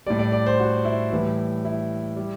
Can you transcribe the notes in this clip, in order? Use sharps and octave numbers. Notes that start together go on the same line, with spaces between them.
A2 G3 D5
D5
D5
C5
F#4
E4
A2 E3 G3
E4
G3